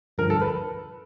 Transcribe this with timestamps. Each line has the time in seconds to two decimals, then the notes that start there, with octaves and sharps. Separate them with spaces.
0.18 G2 D3 F3 A#4
0.30 A4
0.41 B4